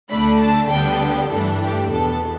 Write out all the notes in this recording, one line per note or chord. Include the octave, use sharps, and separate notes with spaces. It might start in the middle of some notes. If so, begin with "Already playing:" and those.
D2 D3 A3 D4 B5
A5
D2 D3 G3 B3 D4 G5
G2 E3 A3 D4 A4
G4
E2 B2 B3 A4